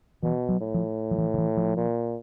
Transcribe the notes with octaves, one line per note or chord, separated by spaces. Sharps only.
B2 E3
F#3
A2
F3
F3
E3
D#3
E3
F3
A#2